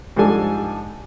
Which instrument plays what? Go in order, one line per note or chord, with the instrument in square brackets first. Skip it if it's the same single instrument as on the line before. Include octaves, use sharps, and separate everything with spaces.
[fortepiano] G#2 F3 G3 D4 A4 G#5